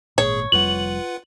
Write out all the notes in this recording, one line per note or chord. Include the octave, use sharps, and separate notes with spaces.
G#1 A#2 G#4 C#5
F1 F2 G3 F4 B4 F#5 F#7